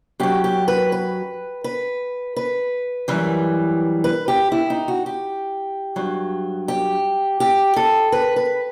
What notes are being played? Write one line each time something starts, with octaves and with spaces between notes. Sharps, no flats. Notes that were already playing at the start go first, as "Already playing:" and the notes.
F#2 F#3 G4
G4
B4
B4
B4
B4
F#2 E3 G3
B4
G4
E4
D#4
F#4
G4
G2 F#3
G4
G4
A4
B4
B4